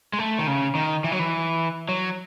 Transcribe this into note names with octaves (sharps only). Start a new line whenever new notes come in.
G#3
A3
D#3
C#3
D#3
E3
F#3
E3
F#3